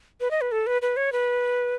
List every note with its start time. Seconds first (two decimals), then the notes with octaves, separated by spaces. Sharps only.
0.21 B4
0.31 D#5
0.41 B4
0.52 A4
0.67 B4
0.82 B4
0.97 C#5
1.12 B4